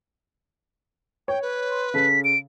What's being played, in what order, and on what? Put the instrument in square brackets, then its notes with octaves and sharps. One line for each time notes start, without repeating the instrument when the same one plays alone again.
[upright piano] C#5 [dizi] G5
[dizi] B4
[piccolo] C6
[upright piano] C#3 A4 [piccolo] B6
[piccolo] D7